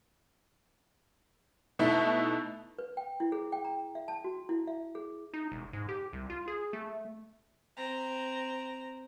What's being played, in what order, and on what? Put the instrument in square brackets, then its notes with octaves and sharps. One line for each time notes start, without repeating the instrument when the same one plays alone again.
[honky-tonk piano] B2 A3 D#4 E4
[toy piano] B4
G5
E4
G#4
G5
A#5
E5
A5
F#4
E4
E5
G#4
[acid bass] D#4
E1
G#2
G4
C2
F4
G#4
A3
[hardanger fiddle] C4 A#5